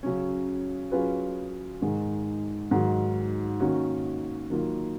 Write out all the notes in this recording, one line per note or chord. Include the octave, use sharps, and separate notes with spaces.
C#3 F#3 C#4
F#3 C#4 F4 G#4 B4
G#2 D#3 G#3
G#2 D#3 F#3
D#3 A#3 C#4 F#4
D#3 F#3 A#3 F4